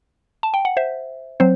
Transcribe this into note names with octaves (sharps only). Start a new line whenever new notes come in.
A5
G5
F#5
C5 E5
F#3 C4 C5